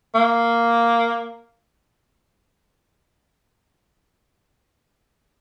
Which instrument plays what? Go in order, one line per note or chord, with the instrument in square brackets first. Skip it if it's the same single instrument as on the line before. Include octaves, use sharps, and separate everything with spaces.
[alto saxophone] A#3